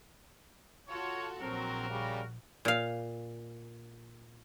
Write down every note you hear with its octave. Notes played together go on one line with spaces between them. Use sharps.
F4 F#4 A4 C#5
A#1 F#3 C4 F#4 A#4
C#3 G3
A#2 F5